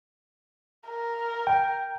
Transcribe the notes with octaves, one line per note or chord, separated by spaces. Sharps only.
A#4
G5